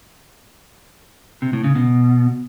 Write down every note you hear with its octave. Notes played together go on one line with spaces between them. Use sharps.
C3
A2
C#3
B2